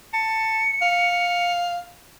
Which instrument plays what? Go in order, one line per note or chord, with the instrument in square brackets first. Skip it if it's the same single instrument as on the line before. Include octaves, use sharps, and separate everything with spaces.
[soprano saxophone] A5 [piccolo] C#7
[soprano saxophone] F5